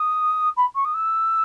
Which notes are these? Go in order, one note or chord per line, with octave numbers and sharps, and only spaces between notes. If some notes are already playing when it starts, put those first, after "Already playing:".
Already playing: D#6
B5
C#6
D#6
E6